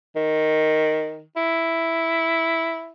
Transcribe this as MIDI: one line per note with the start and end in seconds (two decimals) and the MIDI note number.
0.16 1.23 51
1.36 2.92 64